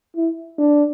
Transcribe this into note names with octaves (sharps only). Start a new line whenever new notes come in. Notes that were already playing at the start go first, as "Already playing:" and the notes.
E4
D4